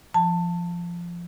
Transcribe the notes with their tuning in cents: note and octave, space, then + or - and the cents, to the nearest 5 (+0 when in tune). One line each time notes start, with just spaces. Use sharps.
F3 -15 A5 +15